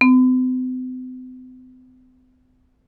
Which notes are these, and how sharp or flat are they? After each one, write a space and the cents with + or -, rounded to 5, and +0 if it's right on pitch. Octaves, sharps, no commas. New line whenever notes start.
C4 -45